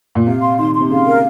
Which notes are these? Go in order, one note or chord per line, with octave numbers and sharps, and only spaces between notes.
A#2
C3 F5
C6
D#3 C6
C6
C3
C#3 F5
A#4